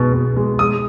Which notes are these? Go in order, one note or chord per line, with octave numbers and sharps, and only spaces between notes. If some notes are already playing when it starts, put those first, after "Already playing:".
Already playing: B2 G#3 B3
B2
G#3
G#3 D#6